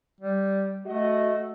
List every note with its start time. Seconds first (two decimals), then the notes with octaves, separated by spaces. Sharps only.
0.21 G3
0.85 A3 F#4 D#5